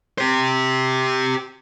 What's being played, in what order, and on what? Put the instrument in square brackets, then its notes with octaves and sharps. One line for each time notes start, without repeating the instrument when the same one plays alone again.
[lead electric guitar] G4 C5